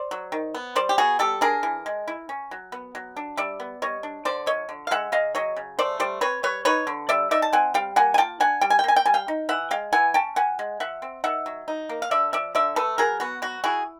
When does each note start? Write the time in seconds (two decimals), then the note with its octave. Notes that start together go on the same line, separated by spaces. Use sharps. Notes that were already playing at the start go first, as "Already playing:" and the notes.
Already playing: C5 D5
0.11 F#3
0.32 D#3
0.55 B3
0.75 G3 C5 D5
0.89 G4
0.98 B3 F#4 G#4
1.19 G3 G4 A4
1.41 D4 G#4 A#4
1.63 E3
1.86 G#3
2.08 E4
2.29 C#4
2.51 F#3
2.72 B3
2.95 F#3
3.16 D4
3.37 G3 D5 E5
3.60 B3
3.82 G3 C#5 D#5
4.03 D4
4.25 D3 C5 D5
4.46 F3 C#5 D#5
4.69 D3
4.87 F5
4.91 G#3 E5 F#5
5.12 C#3 D#5 F5
5.35 F#3 C#5 D#5
5.56 C#3
5.79 A3 C5 D5
6.00 G3 C5 D5
6.21 C4 B4 C#5
6.43 G3 B4 C#5
6.65 D#4 B4 C#5
6.87 D3
7.09 G3 D5 E5
7.31 D#4 D5 E5
7.42 A5
7.53 C4 F#5 G#5
7.74 G3 F5 G5
7.96 A#3 F#5 G#5
8.14 G#5
8.18 F4 G5 A5
8.40 D4 F#5 G#5
8.61 G3 G5
8.70 G#5
8.79 G5
8.84 A#3 G#5
8.96 G5
9.06 G3 G#5
9.14 F5 G5
9.28 D#4
9.49 E3 E5 F#5
9.71 G#3 F5 G5
9.93 E3 F#5 G#5
10.14 C#4 G5 A5
10.36 F3 F#5 G#5
10.59 G#3
10.80 F3 E5 F#5
11.02 C4
11.24 D#3 E5 F#5
11.46 F#3
11.68 D#4
11.89 A#3
12.02 F5
12.11 D3 D5 E5
12.33 F3 D5 E5
12.55 D3 D5 E5
12.76 A3 A4 B4
12.98 F#3 G#4 A#4
13.20 B3 F#4
13.42 F#3 F#4
13.64 E4 F#4 G#4